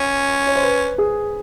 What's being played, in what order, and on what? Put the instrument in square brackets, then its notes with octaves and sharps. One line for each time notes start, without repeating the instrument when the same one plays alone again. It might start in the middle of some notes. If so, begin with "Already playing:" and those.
Already playing: [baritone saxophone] C#4
[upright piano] C#5
C5
B4
G#4